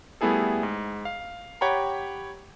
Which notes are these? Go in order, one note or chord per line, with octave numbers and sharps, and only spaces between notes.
G3 A3 B3 E4 G#4 A4
G#2
F5
G4 C#5 F#5 G5 A#5 B5